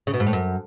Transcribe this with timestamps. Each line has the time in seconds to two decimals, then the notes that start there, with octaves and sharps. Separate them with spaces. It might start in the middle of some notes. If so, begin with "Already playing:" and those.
0.07 C#3
0.14 B2
0.20 G#2
0.26 A2
0.33 F#2